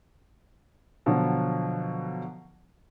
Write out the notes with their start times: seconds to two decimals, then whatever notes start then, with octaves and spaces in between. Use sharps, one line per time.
1.06 B2 D3 F3 F#3